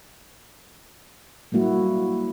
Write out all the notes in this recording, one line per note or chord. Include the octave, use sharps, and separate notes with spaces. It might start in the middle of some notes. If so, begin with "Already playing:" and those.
F#3 G3 A#3 E4 F#4